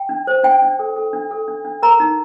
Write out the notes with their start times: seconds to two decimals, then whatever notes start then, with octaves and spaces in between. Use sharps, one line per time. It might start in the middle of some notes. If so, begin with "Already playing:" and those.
Already playing: G5
0.09 D4
0.27 C5
0.44 D4 G5
0.62 D4
0.79 A4
0.96 A4
1.13 D4
1.31 A4
1.48 D4
1.65 D4
1.83 A#4 A#5
2.00 D#4